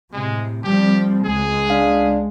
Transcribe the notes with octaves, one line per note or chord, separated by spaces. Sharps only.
A2 C3 G#3
F3 G3 C4 G4
C#2 G#3 G#4
D4 F5